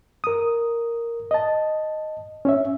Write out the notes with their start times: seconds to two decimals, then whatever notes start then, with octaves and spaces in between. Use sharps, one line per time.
0.24 A#4 D#6
1.31 D#5 A5
2.45 C#4 C#5 E5